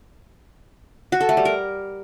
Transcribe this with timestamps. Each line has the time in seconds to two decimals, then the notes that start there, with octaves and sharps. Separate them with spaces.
1.12 F#4
1.21 A4
1.29 A3
1.37 G3
1.45 A#4